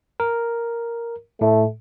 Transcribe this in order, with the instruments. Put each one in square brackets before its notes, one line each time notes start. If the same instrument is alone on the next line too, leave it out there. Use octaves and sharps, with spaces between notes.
[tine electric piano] A#4
[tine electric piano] A2 [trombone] A3